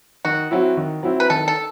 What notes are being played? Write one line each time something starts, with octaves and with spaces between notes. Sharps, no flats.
D#3 F#4
F#3 C4 E4
D#3
F#3 C4 E4
B4
D#3 A4
A4